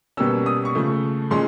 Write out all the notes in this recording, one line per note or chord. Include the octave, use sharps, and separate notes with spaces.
B2 G3 A#3 C#4 E6
D#6
C#6
C#3 F3 A3
A#2 F3 G#3 C#4 C6